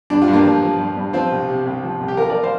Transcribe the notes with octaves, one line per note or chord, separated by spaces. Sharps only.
G2 D4
F4
G2
A#3 D4
F3
F3
G2
G2
F3 C4 F4
C2
C3
C2
F3
C2
G4
F3 F4 A#4
A#4 D5
C5 F5